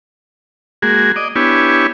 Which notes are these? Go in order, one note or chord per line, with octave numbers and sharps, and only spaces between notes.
G#3 A#3 F#4 G#4
D5 D#5
B3 D4 E4 G4 C#5 G#5